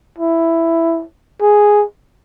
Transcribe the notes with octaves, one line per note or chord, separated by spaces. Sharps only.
E4
G#4